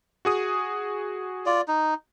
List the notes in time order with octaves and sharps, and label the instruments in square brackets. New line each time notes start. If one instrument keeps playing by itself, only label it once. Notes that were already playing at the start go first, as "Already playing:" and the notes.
[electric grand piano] F#4 G#4 D#6
[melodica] F4 D5
D#4